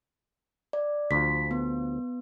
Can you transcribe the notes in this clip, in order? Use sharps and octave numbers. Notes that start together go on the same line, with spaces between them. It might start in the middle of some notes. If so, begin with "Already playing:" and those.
D5
D2 F3 B6
B3